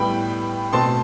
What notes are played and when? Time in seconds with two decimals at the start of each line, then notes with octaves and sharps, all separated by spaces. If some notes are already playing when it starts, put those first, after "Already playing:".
Already playing: A2 G3 B3 G5 B5
0.73 B2 A3 C4 A5 C6